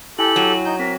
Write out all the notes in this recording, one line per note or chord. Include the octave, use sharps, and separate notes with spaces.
E4 G4 A4 G5 G#5 F#7
F#3
D#4 G6
C4 A#4 B6